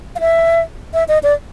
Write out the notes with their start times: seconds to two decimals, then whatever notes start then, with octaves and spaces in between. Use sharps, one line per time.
0.16 F5
0.20 E5
0.94 E5
1.08 D#5
1.23 D5